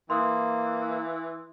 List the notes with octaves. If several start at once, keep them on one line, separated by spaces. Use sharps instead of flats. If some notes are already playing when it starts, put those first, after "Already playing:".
E3 A#3 C6 D#6